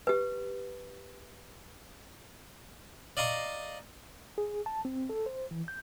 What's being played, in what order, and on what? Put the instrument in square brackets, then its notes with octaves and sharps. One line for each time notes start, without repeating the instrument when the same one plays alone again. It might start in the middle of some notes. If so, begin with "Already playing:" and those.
[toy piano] G4 B4
[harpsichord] D5 D#5 F5 A#5 C#6
[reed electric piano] G#4
A5
C4
A4
C5
E3
G6